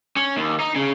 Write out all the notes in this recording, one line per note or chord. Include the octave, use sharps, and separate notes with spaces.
C#4
D#2
D#4
C#3